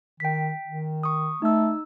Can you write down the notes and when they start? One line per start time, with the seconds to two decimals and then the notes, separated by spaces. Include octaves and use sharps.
0.20 D#3 G5 B6
0.68 D#3
1.03 C#6 D#6
1.42 A3 D#4 E6